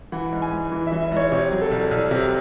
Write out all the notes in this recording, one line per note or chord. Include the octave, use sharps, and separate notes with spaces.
E3 F#5
G#2
G#5
G#2
E3
E5
E3
E5
G#2 C#5
C3 C#5
F#3
A4
C2
C2
C3